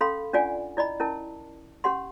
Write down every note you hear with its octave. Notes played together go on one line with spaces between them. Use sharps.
C#4 A4 F5 B5 C6
C#4 D4 F4 D5 F#5 G#5
E4 D5 D#5 B5
C#4 E4 A#4 A5
C#4 G4 F#5 C6